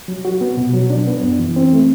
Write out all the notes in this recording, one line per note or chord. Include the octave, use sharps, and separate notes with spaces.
F#3
F#4
B3
B2
F#3
D4
B3
F#2
E3
C4
A3